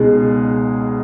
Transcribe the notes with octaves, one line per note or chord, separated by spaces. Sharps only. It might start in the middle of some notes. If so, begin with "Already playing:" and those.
Already playing: C#2 B2 G#3 D#4 G#4